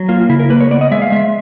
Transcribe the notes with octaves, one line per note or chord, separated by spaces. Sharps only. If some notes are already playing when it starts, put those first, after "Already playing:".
Already playing: F#3
A#3 F4
C#3 E4
A#4
A#3 B4
C#5
B3 D5
D#5
G#3 E5
F5
G#3 E5